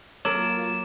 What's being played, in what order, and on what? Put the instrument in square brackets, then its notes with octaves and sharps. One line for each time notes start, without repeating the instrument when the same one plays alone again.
[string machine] F#3 A#3 F4 [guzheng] A4 A#4 [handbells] C#5 [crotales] D6